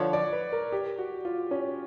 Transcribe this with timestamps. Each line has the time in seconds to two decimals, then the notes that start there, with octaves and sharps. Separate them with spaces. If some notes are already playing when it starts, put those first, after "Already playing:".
Already playing: D3 F3 B4 C#5
0.13 D5
0.33 B4
0.52 A#4
0.72 G4
0.98 F#4
1.25 F4
1.51 C#4